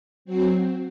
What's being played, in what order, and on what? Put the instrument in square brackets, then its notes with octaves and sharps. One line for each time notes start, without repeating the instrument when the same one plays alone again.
[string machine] F#3 C4 F#4 C5